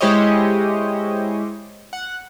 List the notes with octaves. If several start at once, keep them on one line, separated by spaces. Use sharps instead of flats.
G#3 E4 G4 C5 C#5 D#5
F#5